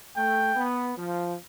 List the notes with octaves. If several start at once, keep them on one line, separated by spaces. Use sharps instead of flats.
A3 G5
B3
F3